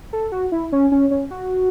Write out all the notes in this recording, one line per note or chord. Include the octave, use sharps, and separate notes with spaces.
A4
F#4
E4
C#4
C#4
C#4
F#4